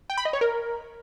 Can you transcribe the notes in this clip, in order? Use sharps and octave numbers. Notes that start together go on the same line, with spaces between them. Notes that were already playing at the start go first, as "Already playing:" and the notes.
G5
B5
D#5
C#5
A#4